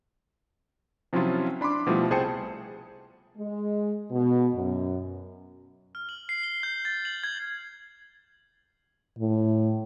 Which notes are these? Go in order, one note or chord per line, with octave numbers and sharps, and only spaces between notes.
C3 F3 F#3 C#4 E4 F4
D4 B5 C6 D6
B2 F3 G3 A3 E4
C2 G#4 C5 G5 A5 C#7
G#3
B2
F#2
F6
F#7
C7
G7
G6
A6
F#7
G#6
A2